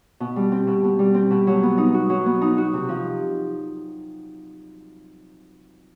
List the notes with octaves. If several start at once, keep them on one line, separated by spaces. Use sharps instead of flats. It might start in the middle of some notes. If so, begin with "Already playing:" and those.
B2
G3
C4
B2
B2
G3
C4
B2
F#3
B3
D#4
F#4
F#3
B3
D#4
F#4
C3
F3